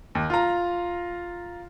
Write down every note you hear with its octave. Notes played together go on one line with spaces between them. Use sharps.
D#2
F4 A#5